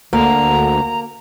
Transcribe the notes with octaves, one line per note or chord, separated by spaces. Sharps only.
D2 D3 A#3 A#5